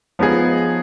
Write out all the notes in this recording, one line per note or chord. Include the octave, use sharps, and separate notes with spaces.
F3 B3 D#4 G#4